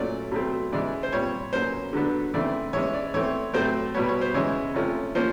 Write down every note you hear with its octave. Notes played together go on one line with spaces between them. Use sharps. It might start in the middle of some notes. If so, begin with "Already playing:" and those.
Already playing: A#2 F#3 A3 C#4 D5
B2 F#3 A3 C4
C#3 E3 G#3 D5
C5
A#2 G3 C4 C#5
B2 F#3 A#3 C#4 C5
D3 F#3 B3 D4
C#3 E3 A3 C4 D5
E3 G#3 C#4 C#5
D5
E3 A3 C4 C#5
A2 F#3 A3 C4 C5
B2 G3 B3 C#5
C#5
C5
C#3 E3 G#3 C#4 C#5
C3 F3 A3 C#4
F3 A#3 C#4 C5